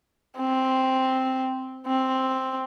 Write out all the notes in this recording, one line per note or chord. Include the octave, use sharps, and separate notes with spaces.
C4
C4